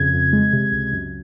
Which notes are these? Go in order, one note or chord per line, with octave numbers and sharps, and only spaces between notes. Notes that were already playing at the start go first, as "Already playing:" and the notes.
Already playing: F2 C#3 G#6
F2
G#3
C3
C#2
F#2